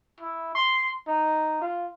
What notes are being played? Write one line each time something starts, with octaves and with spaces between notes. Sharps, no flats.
E4
C6
D#4
F4